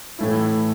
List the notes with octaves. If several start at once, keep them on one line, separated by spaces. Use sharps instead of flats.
A2 E3 A3 E4